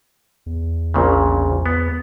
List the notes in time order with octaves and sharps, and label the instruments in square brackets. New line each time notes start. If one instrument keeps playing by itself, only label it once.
[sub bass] E2
[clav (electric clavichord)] A#1 A#2 C#3
B3